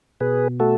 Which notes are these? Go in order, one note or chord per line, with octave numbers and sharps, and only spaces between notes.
B2 G#4 B4
A3 F#4 A4